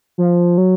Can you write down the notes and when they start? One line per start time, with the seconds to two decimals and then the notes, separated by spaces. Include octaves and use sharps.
0.18 F3
0.58 F#3